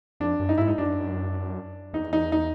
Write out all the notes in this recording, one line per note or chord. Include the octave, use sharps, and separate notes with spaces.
F2 D4
F#2
D#4
G#2 E4
D#4
F#2 D4
E2 D#4
D#4
D#4